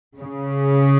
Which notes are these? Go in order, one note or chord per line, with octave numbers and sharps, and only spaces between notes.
C#3